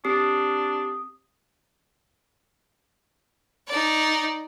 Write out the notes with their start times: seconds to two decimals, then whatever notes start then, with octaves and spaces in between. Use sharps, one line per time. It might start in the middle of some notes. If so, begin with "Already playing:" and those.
0.05 C4 D4 G4 D#6 C7
3.67 D#4 D5